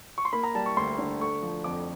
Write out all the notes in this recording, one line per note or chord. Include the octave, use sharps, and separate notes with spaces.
C#6
C6
A#3 B5
A#5
G3 A5
C#6
D2 C6
D3
A3 C#6
F3
F2 D6